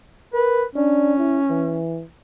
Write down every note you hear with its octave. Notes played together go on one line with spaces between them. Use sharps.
A#4 B4
C#4 D4
E4
E3